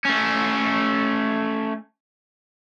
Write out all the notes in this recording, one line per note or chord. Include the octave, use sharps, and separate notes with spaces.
A3 C#4